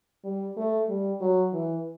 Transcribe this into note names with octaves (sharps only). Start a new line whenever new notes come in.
G3
A3
G3
F#3
E3